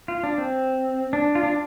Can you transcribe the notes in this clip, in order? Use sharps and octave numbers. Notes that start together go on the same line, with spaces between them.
F4
D4
C4
D4
F4
D4